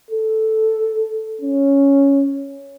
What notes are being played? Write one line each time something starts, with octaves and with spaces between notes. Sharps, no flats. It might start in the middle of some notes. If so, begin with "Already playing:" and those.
A4
C#4